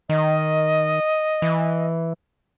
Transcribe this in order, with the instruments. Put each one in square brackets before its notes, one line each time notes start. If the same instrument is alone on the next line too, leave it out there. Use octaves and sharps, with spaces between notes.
[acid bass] D#3 [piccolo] D#5
[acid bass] E3